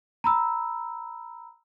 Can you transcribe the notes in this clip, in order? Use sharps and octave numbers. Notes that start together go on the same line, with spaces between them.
A#5 B5 E6